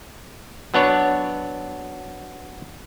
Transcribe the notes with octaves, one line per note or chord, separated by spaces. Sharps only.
F#3 B3 D4 C#5